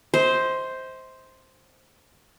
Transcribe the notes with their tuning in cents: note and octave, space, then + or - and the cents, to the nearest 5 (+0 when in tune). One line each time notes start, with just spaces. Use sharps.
C5 +0 D#5 +45